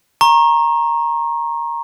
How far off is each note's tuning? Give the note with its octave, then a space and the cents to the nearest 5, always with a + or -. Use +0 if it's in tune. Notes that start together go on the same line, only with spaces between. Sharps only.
A#5 +10 C#6 -35